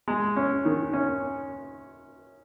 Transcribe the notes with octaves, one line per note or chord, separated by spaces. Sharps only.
G#3
C#4
D#3
C#4